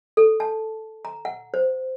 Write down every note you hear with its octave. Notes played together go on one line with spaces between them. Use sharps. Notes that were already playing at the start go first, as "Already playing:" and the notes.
A4
A5
A#5
F#5
C5